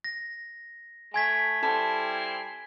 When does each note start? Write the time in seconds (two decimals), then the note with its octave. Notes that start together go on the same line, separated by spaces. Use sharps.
0.04 A#6
1.14 A3 G#5 G#6 B6
1.63 G3 C4 E4 A4